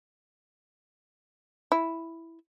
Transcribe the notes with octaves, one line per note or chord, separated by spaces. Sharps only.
E4